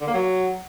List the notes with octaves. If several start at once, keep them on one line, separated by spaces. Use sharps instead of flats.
D3
A#3
F#3